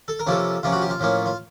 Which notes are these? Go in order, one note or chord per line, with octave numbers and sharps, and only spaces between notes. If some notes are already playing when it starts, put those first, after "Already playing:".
A4
A#4
C3 F3 A#3 C#4 A4
C3 F3 A#3 C#4 F4
F#4
G4
F4
A2 F3 A#3 C#4
F4